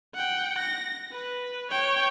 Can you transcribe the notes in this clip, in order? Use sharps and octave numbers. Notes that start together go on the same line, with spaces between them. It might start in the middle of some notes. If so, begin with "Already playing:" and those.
F#5 G5
A#6
B4
C#5 G5